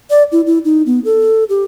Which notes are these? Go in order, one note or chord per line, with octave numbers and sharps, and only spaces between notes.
D5
E4
E4
D#4
B3
A4
G4